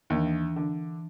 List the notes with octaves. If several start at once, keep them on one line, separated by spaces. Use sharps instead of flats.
D#2 E3 D4
D3